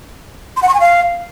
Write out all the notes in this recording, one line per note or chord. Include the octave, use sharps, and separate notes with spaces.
C6
F#5
C#6
G#5
F5